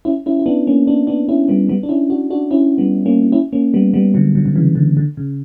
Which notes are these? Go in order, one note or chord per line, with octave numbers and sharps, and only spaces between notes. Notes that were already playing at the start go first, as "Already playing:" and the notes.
C#4 E4
C#4 E4
E4
B3 D4
A#3 C#4
B3 D4
B3 D4
C#4 E4
G3 B3
G3 B3
D4
C#4 E4
D4 F#4
D4 F#4
C#4 E4
G3 B3
A#3 C#4
C#4 E4
A#3 C#4
G3 B3
G3 B3
D3 F#3
D3 F#3
D3
C#3 E3
D3
D3
C#3